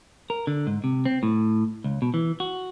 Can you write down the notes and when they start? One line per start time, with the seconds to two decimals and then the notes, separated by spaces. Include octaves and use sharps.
0.30 A#4
0.47 D3
0.67 G#2
0.84 C3
1.06 C4
1.23 A2
1.84 C#2
2.02 B2
2.14 E3
2.40 F#4